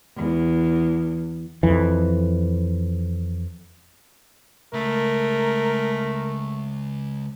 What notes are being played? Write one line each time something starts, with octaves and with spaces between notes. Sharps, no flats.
E2
F2 E3
C#2 A3 A#4